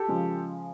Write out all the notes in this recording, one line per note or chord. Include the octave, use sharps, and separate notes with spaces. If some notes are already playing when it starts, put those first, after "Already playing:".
Already playing: G4 A4
C#3 F3 G#3